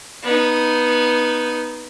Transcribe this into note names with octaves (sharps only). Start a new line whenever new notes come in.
B3 D#4